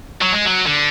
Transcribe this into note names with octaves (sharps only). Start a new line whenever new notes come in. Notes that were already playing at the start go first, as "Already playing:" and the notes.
F#3
G#3
F#3
D3